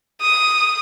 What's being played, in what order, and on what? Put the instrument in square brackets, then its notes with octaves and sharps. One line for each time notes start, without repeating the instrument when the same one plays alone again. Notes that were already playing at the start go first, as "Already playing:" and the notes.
[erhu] D#6